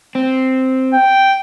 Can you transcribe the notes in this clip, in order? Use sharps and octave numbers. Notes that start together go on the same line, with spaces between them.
C4
G5